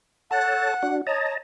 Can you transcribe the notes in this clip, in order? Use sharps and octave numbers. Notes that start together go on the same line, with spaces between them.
A4 C#5 F#5 A5
D4 F#4
C#5 D#5 A5 A#5